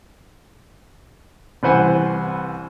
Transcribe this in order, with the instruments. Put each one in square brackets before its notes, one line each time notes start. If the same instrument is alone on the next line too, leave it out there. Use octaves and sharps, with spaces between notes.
[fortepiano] C2 E3 B4 C5 F#5 G#5